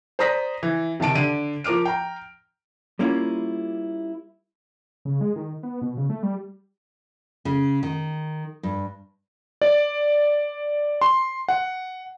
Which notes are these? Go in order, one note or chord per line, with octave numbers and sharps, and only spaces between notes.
C5 D5 A#5 D#6 A#6 B6
E3
C3 D#3 A5 D7
D3 D#7
F3 A#4 D6 F6 D7
G5 A#5
G3 A#3 C#4 E4 F4
C#3
G#3
D#3
B3
B2
C#3
A3
G3
C#3
D#3
G2
D5
C6
F#5